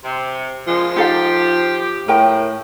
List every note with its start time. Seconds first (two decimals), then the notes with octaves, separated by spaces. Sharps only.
0.04 C3
0.67 A#2 C#3 F3 G#3
0.96 D#4 G4 A4 F5
2.08 A2 A#4 G5